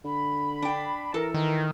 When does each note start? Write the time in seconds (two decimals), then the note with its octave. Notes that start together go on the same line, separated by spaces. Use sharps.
0.05 D3 B5
0.62 D4 G5
1.14 E3 A4 A#4
1.34 D#3 A#4